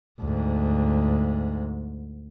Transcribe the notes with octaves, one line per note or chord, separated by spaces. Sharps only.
D2 G#2